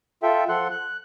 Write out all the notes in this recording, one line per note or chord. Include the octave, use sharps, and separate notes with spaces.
F4 A4 E5 G5
F3 A4 F#5 C6 F#6
F#6